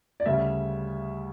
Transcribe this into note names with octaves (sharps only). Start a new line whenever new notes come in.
D5
D2 C#3 G3 E5